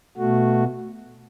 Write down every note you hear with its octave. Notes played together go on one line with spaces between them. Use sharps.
B2 A3 F#4